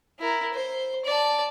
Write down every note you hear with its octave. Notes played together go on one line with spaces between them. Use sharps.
E4 A#4
C5
D5 A5